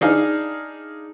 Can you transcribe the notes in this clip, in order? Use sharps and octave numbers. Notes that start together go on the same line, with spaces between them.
D4 D#4 G#4 F5